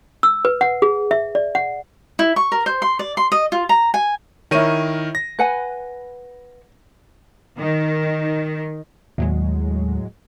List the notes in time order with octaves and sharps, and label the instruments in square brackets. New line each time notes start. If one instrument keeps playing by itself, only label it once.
[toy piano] E6
B4
F#5
G#4
E5
D5
F#5
[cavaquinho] E4
C#6
A#4
C5
C6
D5
C6
D#5
F4
A#5
G#5
[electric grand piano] D#3 A#4 D#7 [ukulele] E4 C#5
[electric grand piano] A#6
[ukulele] B4 F#5 G#5
[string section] D#3
[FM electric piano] D#2 [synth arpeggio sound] A2 F#3 G#3